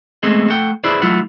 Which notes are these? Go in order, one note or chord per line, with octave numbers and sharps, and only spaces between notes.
G#3 A3 B3 C4 G#4 D#5
A3 F#5 G5
E4 G#4 B4 C5 D5
F#3 A3 E4 F4 F#5